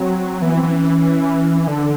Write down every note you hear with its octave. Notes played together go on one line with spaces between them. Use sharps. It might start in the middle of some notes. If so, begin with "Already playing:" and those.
Already playing: F#3 C4
E3 B3
C4
E3
C#4
C#4
D3 D4